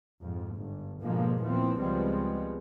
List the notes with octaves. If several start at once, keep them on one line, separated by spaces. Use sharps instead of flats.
F2 G#2
G1
G#2 B2 D3 F3 G#3 A#3
D#2 A#2 E3 F3 B3 C4
C#2 F3 G3 G#3 B3 C4